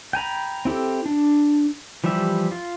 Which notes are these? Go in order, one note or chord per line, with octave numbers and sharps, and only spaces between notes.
G5 G#5 A#5 B5
C4 E4 G4 A4
D4
E3 F3 G3 G4 E5
F4